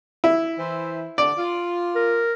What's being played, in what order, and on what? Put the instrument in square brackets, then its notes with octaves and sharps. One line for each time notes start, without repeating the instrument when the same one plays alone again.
[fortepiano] E4
[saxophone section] E3 C5
[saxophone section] D3 [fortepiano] D5
[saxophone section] F4
[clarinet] A#4